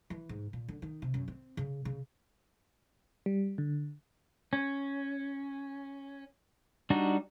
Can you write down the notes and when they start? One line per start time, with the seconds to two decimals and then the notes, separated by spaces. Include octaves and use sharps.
0.10 E3
0.29 G#2
0.53 A#2
0.69 D3
0.82 D#3
1.02 C3
1.14 F#2
1.28 C4
1.57 C#3
1.85 C#3
3.26 G3
3.58 D3
4.53 C#4
6.90 G3 D4 D#4 F#4